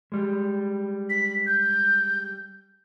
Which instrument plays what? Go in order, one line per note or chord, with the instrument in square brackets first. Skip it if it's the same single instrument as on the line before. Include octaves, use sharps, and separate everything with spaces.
[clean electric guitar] G3 G#3
[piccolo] B6
G6